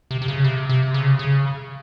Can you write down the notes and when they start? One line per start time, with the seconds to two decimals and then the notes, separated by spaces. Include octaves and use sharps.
0.11 C3
0.22 C3
0.28 C#3
0.44 C3
0.69 C3
0.94 C#3
1.19 C#3